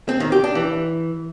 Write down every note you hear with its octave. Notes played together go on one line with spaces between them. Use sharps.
C4
D#3
G4
D4
E3